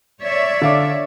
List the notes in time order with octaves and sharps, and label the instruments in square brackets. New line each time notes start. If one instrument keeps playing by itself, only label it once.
[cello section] C#5 D5 E5
[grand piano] D3 F5 D6